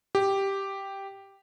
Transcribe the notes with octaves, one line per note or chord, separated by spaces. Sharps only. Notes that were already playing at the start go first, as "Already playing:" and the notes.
G4